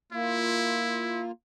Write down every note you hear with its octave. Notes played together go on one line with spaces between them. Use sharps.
A#3 E4 F4